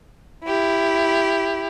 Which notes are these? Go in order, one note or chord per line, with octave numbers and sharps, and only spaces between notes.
E4 G4